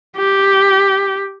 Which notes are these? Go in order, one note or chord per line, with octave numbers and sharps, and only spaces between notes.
G4